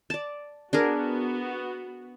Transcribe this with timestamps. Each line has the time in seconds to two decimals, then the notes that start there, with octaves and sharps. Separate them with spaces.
0.10 D5 A5
0.73 B3 D4 F#4 G#4 A#4